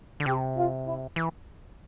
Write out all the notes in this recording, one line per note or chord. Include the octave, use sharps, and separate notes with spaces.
D3
C3 G4
F4
E4
E3